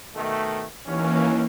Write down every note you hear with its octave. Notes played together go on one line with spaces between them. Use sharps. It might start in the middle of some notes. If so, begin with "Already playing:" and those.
B2 D#3 A3
D#2 E3 A#3 C#4